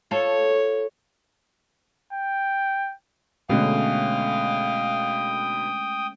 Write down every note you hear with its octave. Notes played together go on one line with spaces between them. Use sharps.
F4 A4 C#5
G5
B2 D3 G#3 A3 C#4 F5 G5 D#6